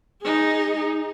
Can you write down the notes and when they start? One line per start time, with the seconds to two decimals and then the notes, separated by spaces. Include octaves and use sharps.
0.22 D#4 G#4